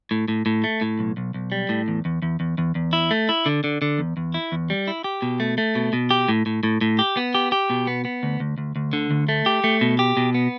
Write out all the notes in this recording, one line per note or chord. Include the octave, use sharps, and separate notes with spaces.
A2
A2
A2
A3
A2
B1
B1
B1
G3
A2
E2
E2
E2
E2
E2
E2
E4
A3
E4
D3
D3
D3
E2
E2
E4
E2
G3
E4
G4
B2
A3
A3
B2
B2
G4
A2
A2
A2
A2
G4
B3
G4
G4
B2
B3
B3
D2
D2
D2
D2
D3
D2
A3
G4
A3
B2
G4
B2
B3